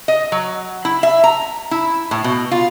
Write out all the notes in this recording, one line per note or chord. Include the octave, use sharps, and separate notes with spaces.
D#5
F#3
E4
E5
A#5
E4
A2
B2
F4